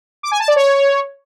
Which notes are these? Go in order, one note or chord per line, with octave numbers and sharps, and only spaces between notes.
D6
G#5
A5
D5
C#5